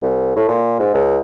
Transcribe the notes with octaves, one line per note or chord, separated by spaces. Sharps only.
C2
A2
A#2
G#2
C#2